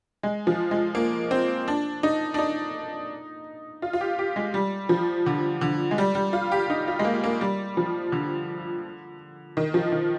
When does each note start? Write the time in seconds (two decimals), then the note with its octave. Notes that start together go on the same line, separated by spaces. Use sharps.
0.23 G#3
0.47 F3
0.71 G#3
0.95 A#3
1.31 C4
1.68 D4
2.03 D#4
2.34 D4
2.39 D#4
3.82 F4
3.93 F4
4.01 G4
4.19 G4
4.36 G#3
4.54 G3
4.89 F3
5.26 D3
5.61 D3
5.91 G#3
5.98 G3
6.15 G3
6.33 F4
6.52 G4
6.70 D#4
6.88 F4
6.99 G#3
7.05 A#3
7.24 A#3
7.41 G3
7.77 F3
8.12 D3
9.57 D#3
9.74 F3
9.92 D#3